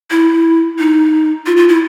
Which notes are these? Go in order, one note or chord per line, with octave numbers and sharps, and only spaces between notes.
E4
D#4
F4
F4
E4